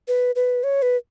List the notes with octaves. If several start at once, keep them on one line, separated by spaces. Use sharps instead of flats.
B4
B4
C#5
B4